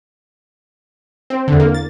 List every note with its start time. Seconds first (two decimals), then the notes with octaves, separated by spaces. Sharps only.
1.30 C4
1.48 E2 D3
1.60 A#3
1.74 A6